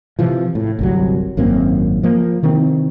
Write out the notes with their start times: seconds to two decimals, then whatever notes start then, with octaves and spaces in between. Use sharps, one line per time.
0.19 C3 E3 F3
0.55 A2
0.79 G1 C2 F#3
1.37 G#1 F#2 A#3 C4
2.03 F3 A#3
2.43 C3 D#3 E3 C4